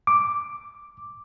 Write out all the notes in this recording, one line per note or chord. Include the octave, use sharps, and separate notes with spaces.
D6